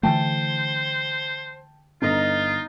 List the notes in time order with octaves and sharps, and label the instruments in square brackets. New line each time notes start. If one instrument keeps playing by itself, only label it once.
[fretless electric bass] D3 E3 A3 [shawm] C5 [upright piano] G5 A5
[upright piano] G1 [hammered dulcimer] D#4 D#5 A#5 [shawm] F4